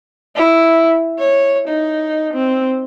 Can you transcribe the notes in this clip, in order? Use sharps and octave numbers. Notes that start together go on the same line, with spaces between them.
E4
C#5
D#4
C4